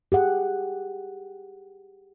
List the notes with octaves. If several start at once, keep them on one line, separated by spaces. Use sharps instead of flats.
G4 G#4 F#5